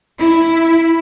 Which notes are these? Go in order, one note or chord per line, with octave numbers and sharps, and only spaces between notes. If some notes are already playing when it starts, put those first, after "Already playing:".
E4